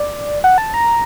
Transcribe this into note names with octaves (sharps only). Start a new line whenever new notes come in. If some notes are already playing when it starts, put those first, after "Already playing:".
Already playing: D5
F#5
A5
A#5